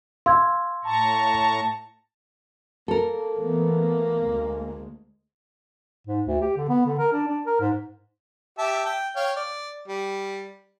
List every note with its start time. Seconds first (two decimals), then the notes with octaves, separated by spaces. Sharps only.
0.26 F5 C6 E6 G#6
0.84 A2 A5 A#5 C#6
2.88 A#3 A4 A#4
3.38 E3 A3 B3
4.22 D2 G#3
6.07 G#2
6.27 D2
6.41 G4
6.57 D3
6.69 B3
6.86 D3
6.99 A#4
7.13 D4
7.28 D4
7.46 A#4
7.61 G#2
8.59 G4 E5 A5
8.86 G5
9.16 C#5 F5 G5
9.36 D5
9.88 G3